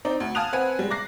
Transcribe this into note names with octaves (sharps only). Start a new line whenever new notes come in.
C4 D#4 D5
D2
F5 G#5 A5 D#6 F#6 F7
C4 B4 F#5 G#5
G3 G#3
D6 F#6 A#6 C7